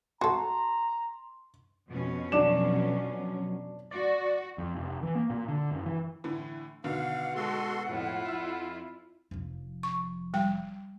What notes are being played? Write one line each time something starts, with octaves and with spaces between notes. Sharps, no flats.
F#4 A4 A#5 C6
F2 B2 C#4
F#3 D4 D6 E7
F#4 D5
F2
F1
E3
A#3
A#2
D3
F#1
E3
A2 D3 E3
B2 D3 D#3 F5 F#5
G#3 F#4 A4 C6
F2 A2 E4 F4
F2 E5 E6
F1 F3
C#6
G3 G5